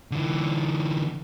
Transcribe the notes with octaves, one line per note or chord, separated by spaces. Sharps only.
D3 E3